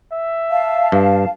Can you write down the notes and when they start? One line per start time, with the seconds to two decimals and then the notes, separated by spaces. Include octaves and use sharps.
0.12 E5
0.50 F5 A5
0.92 G2